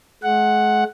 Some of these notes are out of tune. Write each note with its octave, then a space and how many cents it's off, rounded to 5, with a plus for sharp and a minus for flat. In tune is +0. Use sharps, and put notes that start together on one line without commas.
G#3 +40 F#5 +0